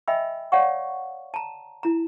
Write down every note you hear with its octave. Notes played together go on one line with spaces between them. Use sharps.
D#5 E5 G5 G#5 B5 E6
C#5 D5 F5 F#5 C#6
A5 A#5
E4 A#5